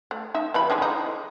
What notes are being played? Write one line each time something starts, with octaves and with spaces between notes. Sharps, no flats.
A3
D#4 E5
E3 G3 B5
D3 E3 G#3
D#4